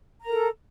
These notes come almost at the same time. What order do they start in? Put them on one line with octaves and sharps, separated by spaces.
A#5 A#4 A4